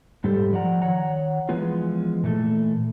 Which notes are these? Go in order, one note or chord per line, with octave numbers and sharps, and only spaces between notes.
G#2 G3 G4 A4 C5
F3 D5 F#5 A#5
D#3 C#5 F#5 A#5
E3 F3 G#3 B3 F4
A#2 E3 A3 A4